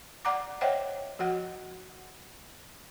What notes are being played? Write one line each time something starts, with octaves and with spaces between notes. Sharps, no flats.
D5 F#5 A#5 D6
C5 C#5 D#5 E5 F#5 G5
F3 F#4 F#5